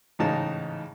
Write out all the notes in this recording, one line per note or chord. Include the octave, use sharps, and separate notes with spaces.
A1 G#2 C#3 D#4 A5